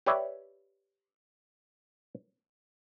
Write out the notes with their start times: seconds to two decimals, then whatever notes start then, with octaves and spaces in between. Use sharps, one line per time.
0.06 G4 B4 C#5 D5 E5